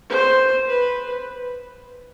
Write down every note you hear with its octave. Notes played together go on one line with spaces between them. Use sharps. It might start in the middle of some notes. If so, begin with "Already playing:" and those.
C5
B4